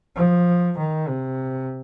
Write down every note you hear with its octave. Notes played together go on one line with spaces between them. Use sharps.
F3
D#3
C3